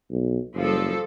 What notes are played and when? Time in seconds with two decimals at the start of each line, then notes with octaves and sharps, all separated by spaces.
0.11 B1
0.55 F#1 F3 G3 A4